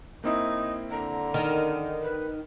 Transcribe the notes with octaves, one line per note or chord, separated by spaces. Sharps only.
A#3 C4 D#4 E4
D3 A#5
D#3
B4